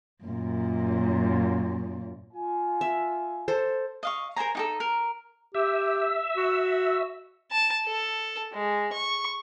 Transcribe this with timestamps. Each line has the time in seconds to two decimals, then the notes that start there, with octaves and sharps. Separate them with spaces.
0.24 F#2 A#2
2.33 F4 G#5
2.81 E5
3.48 A4 C5
4.03 D#5 F5 C#6
4.36 A#4 C5 G#5 A#5
4.55 D#4 G4 A4
4.80 A#4
5.54 G4 E5 E6
6.37 F#4
7.51 A5
7.86 A4
8.53 G#3
8.93 C#6